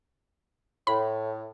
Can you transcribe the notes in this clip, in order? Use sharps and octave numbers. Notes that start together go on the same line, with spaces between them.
A2 B5